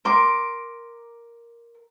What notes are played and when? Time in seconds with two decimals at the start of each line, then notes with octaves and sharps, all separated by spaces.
0.05 A#4 C6 D6